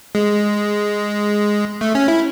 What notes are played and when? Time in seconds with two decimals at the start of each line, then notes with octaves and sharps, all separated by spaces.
0.15 G#3
1.81 A3
1.95 C#4
2.08 E4